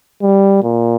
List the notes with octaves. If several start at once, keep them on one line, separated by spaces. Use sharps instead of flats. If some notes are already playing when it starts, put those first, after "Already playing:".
G3
A#2